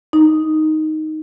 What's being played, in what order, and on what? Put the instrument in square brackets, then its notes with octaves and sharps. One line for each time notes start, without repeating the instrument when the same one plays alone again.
[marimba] D#4